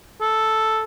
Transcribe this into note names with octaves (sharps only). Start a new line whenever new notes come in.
A4